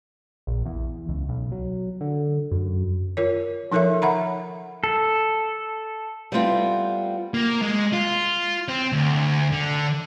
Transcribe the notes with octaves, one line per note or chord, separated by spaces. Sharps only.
A#1
E2
C#2
B1
F#3
D3
F#2
F4 A#4 C#5
F3 D#4 A4 A#4 C#5 E5
E5 F#5 A#5 B5
A4
G3 A3 B3 C4 F4
A#3
G#3
F4
C4
D2
D3